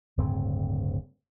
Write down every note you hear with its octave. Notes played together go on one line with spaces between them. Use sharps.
D1 G2 C#3 C4